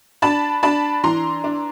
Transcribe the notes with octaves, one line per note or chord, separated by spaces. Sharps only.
D4 A5 B5
D4 A5 B5
E3 A#5 C6
D4